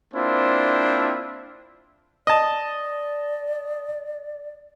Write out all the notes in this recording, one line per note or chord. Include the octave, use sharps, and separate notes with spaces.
A#3 C4 D4 E4 F4 C5
D5 D#5 A5